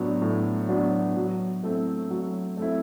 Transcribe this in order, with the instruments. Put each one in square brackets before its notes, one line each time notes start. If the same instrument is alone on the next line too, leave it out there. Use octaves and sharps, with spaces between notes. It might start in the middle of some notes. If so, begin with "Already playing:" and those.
Already playing: [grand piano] A2 F#3 B3 D4
A2
F#3 B3 D4
F#3
A3 C4 E4
F#3
A3 C4 E4